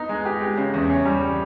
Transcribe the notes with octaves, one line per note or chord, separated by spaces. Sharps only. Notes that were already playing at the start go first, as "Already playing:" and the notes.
Already playing: B3 D#4
G#3
G4
G#3
C#3
E2
C#4
G3